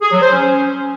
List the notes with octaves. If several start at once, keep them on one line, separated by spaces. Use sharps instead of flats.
G#4
F#3
C5
C#4